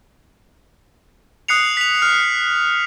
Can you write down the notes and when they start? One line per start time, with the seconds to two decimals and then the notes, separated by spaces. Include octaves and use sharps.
1.48 D#6 F#6 C7 C#7 F7
1.77 B6 F7
2.02 F6